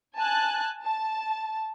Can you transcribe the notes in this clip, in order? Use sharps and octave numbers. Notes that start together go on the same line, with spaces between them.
G#5 A5 F#6
A5